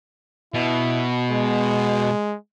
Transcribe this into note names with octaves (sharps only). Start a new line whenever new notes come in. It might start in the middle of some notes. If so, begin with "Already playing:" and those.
B2 E4
G#3